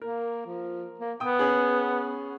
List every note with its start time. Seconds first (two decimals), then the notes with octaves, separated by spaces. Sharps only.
0.02 A#3 A#4
0.47 F3
1.00 A#3
1.20 B3 G5 D#6
1.39 C#4 G#4